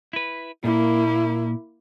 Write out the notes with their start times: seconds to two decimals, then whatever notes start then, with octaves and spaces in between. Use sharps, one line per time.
0.13 E4 B4
0.64 A#2 A#3 E4